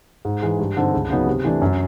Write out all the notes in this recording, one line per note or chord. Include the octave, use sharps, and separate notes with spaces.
G#2
E3 G#3
G2
D3 G3 C4 D#4
C#2
C#3 F#3 B3 D#4
C3
E3 A3 D4
F#2